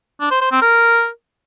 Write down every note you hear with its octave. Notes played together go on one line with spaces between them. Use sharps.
D4
C5
C5
C4
A#4